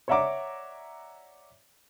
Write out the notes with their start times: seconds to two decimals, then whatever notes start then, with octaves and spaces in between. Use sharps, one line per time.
0.08 C#5 D5 E5 F#5 A#5 D6